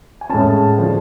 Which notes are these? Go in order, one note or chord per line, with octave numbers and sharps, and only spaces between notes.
G#5
A2 G#3 C#4 A5
D3 F3